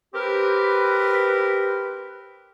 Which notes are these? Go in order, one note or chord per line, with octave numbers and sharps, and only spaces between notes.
C4 G4 A#4 B4